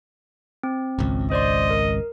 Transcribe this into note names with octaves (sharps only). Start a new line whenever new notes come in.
C4
G#1 C#2
C5 D5 D#5 C6
A#4